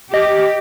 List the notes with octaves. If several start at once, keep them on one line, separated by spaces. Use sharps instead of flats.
G4 D#5